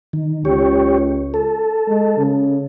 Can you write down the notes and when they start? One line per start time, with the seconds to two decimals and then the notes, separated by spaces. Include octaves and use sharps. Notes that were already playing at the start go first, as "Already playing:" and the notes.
0.13 D#3
0.45 C#2 G4 C#5
1.34 A4
1.88 G#3
2.18 C#3